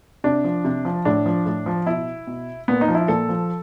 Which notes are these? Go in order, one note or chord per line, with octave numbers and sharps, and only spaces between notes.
C3 D4
F3
C3
F3
A2 D4
F3
A2
F3
B2 E4
B2
A#2 B3
D#4
F3
E4
A#2 A4
F3